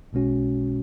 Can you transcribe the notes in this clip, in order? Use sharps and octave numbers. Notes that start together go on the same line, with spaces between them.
B1 B2 G#3 C#4 F#4